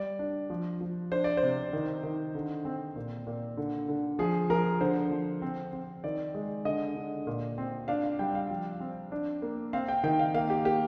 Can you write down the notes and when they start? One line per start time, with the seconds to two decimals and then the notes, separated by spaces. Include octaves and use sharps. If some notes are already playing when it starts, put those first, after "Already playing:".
Already playing: G3 D5
0.19 D4
0.50 F3
0.81 F3
1.11 D4 C5
1.24 D5
1.37 C5
1.43 C3
1.73 D#3
2.03 D#3
2.35 D3
2.65 C4
2.96 A#2
3.27 A#2
3.57 D3
3.88 D3
4.19 F3 G#4
4.50 F3 A#4
4.81 D3 C5
5.11 F3
5.42 C4
5.73 C4
6.04 D#3 D5
6.35 G#3
6.65 D3 D#5
6.96 D3
7.27 A#2
7.58 C4
7.88 D4 F5
8.04 F5
8.19 G3 G5
8.35 F5
8.50 F3
8.80 C4
9.12 D4
9.42 A#3
9.73 C4 F5
9.88 G5
10.03 D#3 G5
10.19 F5
10.34 A#3 F5
10.50 G4
10.65 A#3 G4